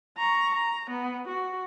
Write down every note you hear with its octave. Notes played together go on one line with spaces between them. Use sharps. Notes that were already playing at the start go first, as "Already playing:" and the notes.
A#5 C#6
A#5
B3
F#4